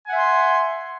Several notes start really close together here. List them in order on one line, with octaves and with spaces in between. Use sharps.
G#5 F#5 E5 C6